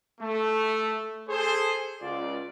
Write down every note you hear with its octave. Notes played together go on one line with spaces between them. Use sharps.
A3
G#4 A4 C5
C#2 F4 D5